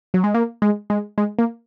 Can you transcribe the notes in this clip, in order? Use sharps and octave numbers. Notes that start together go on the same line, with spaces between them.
F#3
G#3
A#3
G#3
G#3
G#3
A#3